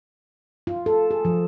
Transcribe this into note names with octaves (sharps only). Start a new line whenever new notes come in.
F4
A4
G#4
F3